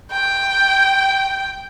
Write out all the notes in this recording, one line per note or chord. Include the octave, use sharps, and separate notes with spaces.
G5